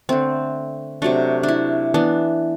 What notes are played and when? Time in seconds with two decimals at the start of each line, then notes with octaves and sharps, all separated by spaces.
0.09 D3 A3 C4
1.02 C3 F#3 A3 D4
1.43 D4
1.48 E4
1.94 E3 B3 D4